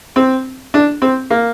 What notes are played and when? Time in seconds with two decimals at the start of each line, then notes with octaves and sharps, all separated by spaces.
0.16 C4
0.74 D4
1.02 C4
1.30 A#3